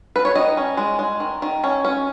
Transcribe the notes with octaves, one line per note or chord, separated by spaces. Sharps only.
B4
C#5
D#3 D#5
C#4
G#3
G#3
D#3
D#3
C#4
C#4